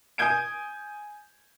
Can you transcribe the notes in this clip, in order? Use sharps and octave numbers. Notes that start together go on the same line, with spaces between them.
G#5 D#6 G6 G#6 D7